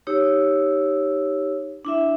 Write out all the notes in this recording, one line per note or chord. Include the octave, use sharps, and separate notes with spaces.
D#4 G4 C#5 E6
D4 E4 E5